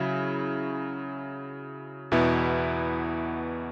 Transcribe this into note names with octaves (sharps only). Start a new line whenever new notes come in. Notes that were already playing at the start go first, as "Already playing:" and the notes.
Already playing: C#3 F#3 C#4 E4
E2 B2 B3 E4